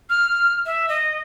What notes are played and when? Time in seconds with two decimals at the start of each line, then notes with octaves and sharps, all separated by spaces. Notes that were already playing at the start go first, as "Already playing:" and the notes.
0.10 F6
0.66 E5
0.89 D#5